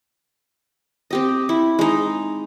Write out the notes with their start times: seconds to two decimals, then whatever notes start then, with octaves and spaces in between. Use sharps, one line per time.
1.11 C4 G4 D#5
1.49 E4
1.79 G#3 D#4